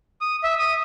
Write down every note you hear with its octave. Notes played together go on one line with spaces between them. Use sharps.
D#6
E5
D#6